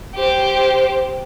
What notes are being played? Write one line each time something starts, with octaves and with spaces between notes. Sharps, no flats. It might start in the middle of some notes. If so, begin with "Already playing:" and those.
G4 C5